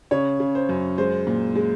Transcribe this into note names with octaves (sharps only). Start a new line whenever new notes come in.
C#3 C#5
C#3
C5
F#2
G#3 C5
A#2
G#3